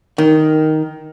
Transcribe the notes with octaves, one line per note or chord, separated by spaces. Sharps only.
D#3